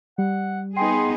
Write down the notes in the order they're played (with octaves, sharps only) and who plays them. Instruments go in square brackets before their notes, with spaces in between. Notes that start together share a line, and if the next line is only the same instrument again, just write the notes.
[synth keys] G3 [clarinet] F#5
[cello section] B3 D#4 G#4 [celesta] G5 G#5 [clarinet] C6